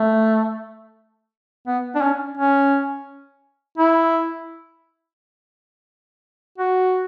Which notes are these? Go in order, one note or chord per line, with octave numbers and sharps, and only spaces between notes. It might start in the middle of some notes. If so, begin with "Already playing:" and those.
Already playing: A3
B3
D4
C#4
C#4
E4
F#4